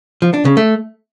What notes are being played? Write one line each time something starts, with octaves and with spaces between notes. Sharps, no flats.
F3
D4
C#3
A3